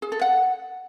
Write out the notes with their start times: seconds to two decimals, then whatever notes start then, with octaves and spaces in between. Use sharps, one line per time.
0.02 G#4
0.12 A4
0.21 F#5